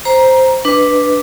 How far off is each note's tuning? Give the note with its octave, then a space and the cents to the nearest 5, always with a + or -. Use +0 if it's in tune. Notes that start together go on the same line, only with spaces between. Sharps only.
C5 +0 A#5 +15
D4 +0 B4 +0 D#5 +0